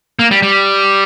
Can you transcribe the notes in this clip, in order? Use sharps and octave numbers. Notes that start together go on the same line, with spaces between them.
A#3
G3
G3